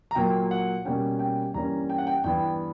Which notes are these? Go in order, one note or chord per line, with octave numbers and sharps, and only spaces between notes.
A#5
A#2 F#3 A#3 G5
F#5
B2 G3 A#3 C#4 G5
G5
G2 E3 G3 A#3 C#4 A#5
G5
F#5
G5
G2 E3 B3 G5